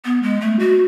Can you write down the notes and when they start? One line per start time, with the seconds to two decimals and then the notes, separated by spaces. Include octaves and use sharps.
0.05 B3
0.23 G#3
0.41 A3
0.59 F#4